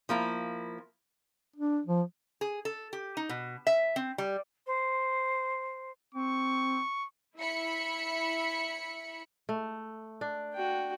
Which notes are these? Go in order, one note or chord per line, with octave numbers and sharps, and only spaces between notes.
F3 A#3 E4
D4
F3
G#4
A4
G4
D#4
B2
E5
C4
G3
C5
C4 C#6
E4 E5 B5 C#7
A3
D4
F#4 G5